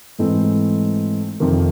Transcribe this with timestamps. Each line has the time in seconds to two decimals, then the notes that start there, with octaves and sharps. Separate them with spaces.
0.19 G#2 E3 A3 C4 D#4
1.40 F2 C3 D#3